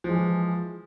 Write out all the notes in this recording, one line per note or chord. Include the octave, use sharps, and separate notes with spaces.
E3 F3 G#3